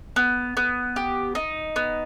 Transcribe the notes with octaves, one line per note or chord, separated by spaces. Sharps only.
B3
B3
G4
D#4
B3